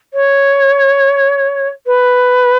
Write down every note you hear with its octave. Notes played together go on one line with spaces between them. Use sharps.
C#5
B4